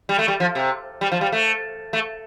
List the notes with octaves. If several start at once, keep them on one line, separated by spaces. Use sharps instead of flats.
G3
A3
G3
F3
C3
G3
F3
G3
A3
A3